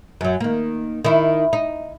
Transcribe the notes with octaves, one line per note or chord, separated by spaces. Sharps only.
F#2 F#3
D#3 A#3
D#3 E4
D#4